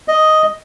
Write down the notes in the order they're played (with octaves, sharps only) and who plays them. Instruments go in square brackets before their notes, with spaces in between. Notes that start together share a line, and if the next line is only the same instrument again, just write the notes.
[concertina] D#5